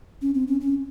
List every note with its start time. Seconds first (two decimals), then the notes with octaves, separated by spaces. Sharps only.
0.22 C#4
0.34 C4
0.48 C#4
0.61 C#4